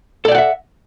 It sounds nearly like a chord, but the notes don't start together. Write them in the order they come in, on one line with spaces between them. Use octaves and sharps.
A4 D5 G5 F#5 E5